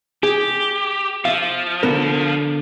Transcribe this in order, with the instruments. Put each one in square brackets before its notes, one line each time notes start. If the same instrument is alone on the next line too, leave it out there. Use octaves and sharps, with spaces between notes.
[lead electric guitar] G4 [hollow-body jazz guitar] G#4
[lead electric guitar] F3 [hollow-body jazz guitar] E5 F5
[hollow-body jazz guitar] D3 B3 A#4